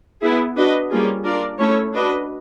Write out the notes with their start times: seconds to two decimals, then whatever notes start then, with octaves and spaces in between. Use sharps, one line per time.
0.21 B3 E4 G#4
0.56 D4 F#4 B4 D#5
0.90 G3 A#3 C#4 F4 G#4
1.24 D4 F4 A#4 D5
1.59 A3 C#4 E4 A4 C#5
1.93 D4 F#4 B4 D#5